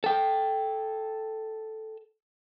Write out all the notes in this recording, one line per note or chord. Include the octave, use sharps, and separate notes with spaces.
A4 G5